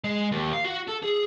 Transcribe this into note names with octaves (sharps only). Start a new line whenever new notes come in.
G#3
D#2
F5
F#4
A4
G#4